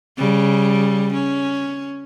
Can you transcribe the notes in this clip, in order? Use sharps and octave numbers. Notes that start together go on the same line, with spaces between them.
C#3 G3
C#4